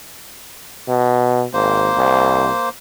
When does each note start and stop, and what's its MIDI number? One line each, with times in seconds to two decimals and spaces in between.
0.88 1.45 47
1.53 1.89 32
1.53 2.69 58
1.53 2.69 72
1.97 2.49 36